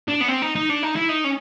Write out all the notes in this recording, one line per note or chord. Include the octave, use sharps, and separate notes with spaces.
D4
B3
C4
D#4
D#4
D4
D#4
E4
D#4
C#4